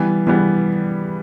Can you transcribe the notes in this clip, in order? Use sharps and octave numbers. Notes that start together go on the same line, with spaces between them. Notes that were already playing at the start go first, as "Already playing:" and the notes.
Already playing: E3 G3 B3
E3 G3 B3